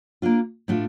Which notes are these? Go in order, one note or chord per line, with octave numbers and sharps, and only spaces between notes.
A#3 D4 F4
A2 A3 D4 F4